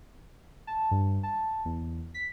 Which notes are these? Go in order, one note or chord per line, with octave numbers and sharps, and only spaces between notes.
A5
G2
A5
E2
B6